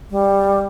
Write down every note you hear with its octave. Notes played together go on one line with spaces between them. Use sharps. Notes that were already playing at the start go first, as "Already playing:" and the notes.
G3